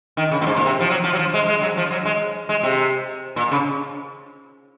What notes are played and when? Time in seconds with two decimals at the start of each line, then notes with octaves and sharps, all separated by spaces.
0.17 D#3
0.31 C#3
0.41 A#2
0.46 G#2
0.56 A#2
0.66 C3
0.80 F3
0.90 F#3
1.04 F3
1.14 F#3
1.19 F3
1.34 G#3
1.48 G#3
1.62 F#3
1.77 F3
1.91 F#3
2.05 G#3
2.49 G#3
2.63 C3
3.36 A#2
3.51 C#3